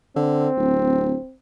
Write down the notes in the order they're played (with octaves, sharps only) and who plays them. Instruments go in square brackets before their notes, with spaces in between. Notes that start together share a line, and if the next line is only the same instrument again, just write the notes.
[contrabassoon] D3 [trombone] C4
[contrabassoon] D1